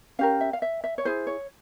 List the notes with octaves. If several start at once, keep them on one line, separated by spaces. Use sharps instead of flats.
C#4 G4 A#4 F5
E5
F5
E5
E5
C#5
E4 G#4 C5
C#5